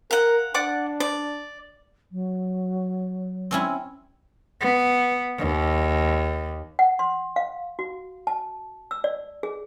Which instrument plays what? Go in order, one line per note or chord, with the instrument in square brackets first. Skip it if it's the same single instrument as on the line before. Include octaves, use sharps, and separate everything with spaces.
[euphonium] A#4 [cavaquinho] F5 F#5
[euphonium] D4 [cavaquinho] D5 F#5 D6
[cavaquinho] D5
[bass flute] F#3
[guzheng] C4 C#4 E4
[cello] B3
D#2
[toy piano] F#5
C6
F5
F#4
A5
E6
D5
G#4